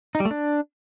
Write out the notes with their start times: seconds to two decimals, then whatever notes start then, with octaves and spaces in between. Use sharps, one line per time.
0.15 D#4
0.20 G3
0.25 A3
0.31 D4